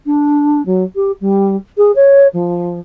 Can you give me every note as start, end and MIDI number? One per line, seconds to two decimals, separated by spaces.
0.05 0.63 62
0.65 0.83 54
0.95 1.11 67
1.20 1.55 55
1.77 1.91 68
1.95 2.27 73
2.33 2.79 53